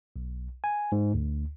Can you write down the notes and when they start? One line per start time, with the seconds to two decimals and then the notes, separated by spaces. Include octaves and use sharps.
0.16 B1
0.64 G#5
0.92 G#2
1.14 D2